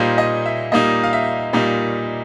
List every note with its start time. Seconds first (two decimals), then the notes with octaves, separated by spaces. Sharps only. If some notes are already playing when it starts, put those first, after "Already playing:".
Already playing: A#2 G3 A#3 D#4 C5
0.18 D#5
0.46 E5
0.72 A#2 G3 A#3 D#4 D#5
1.03 F5
1.13 E5
1.53 A#2 G3 A#3 D#4